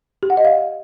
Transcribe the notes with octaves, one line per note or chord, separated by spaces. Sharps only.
G4
F#5
D#5
F5